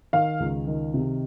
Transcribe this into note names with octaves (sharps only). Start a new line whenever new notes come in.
D#3 F5
C#2
D#3
C3